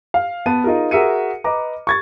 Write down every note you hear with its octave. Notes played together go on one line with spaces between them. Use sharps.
F5
B3 A5 D#7
D#4 F4 G#4 A#4
F#4 G#4 A#4 E5 C#7 D#7
B4 D#5 A#5 D6
C#6 G#6 A6